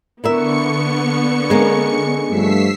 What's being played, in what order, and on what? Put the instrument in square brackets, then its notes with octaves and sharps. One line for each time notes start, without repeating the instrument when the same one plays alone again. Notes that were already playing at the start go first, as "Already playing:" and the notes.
[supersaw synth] D3 C#6 C#7 [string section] B3 [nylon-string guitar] E4 A#4 E5
[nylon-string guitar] G#3 A#3 C#4
[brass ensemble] G2 F3 A3 [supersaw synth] E6 B6 C7